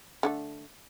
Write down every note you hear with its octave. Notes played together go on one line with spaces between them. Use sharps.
D3 G3 A3